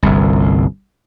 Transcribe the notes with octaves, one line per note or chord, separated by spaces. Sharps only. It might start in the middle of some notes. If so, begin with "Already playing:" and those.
G1 C2